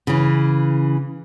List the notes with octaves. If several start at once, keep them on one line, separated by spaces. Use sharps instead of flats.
C#3 E3